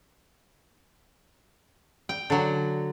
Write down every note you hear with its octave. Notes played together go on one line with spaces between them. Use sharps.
G5
D3 F#3